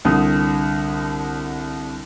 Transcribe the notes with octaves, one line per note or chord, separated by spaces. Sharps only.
C2 D3 D#6